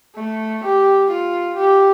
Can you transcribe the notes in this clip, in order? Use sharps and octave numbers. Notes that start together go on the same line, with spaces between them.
A3
G4
F4
G4